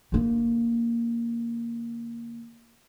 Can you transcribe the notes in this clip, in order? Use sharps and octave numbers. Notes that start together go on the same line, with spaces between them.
D3 A#3